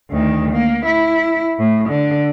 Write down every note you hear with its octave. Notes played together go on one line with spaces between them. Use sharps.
D2 D#3
A#3
E4
A2
D3